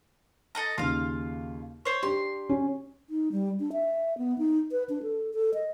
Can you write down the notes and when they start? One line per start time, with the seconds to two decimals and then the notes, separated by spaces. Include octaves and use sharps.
0.55 A4 D#5 A#5
0.78 D#2 C#3 F4 F5
1.85 C5 C#5
2.03 D4 G4 C6
2.49 C#4
3.10 D#4
3.32 G3
3.60 D4
3.72 E5
4.18 B3
4.38 D#4
4.72 B4
4.89 D4
5.03 A4
5.34 A4
5.54 D#5